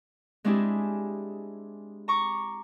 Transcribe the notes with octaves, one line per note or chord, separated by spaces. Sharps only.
G#3 C4 D4 E4 G4 G#4
A#5 C#6 D6